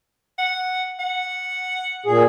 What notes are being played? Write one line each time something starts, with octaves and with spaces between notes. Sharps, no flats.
F#5
F#5
A#2 G#4